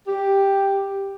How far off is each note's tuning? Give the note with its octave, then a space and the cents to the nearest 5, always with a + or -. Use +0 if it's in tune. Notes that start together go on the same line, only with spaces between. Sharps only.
G4 +5